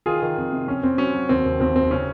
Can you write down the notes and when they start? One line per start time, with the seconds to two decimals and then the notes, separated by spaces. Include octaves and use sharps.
0.06 D#3 F4 G#4
0.22 D#3
0.37 F2
0.52 C3
0.68 F2 C#4
0.83 F2 C4
0.98 F#3 C#4
1.15 F#3
1.29 D#2 C4
1.45 D#2
1.60 D#2 C4
1.76 F1 C4
1.91 C#3 C#4